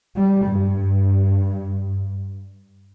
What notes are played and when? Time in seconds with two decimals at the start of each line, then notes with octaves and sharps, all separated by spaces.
0.16 G3
0.46 G2